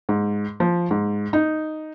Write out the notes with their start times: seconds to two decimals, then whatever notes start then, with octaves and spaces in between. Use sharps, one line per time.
0.09 G#2
0.60 F3
0.91 G#2
1.33 D#4